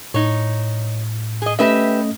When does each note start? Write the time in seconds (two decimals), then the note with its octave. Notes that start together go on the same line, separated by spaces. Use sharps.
0.14 A2 D#4 C#5
1.42 G#4 D#5
1.59 A3 C#4 G4 B4 D#5 E5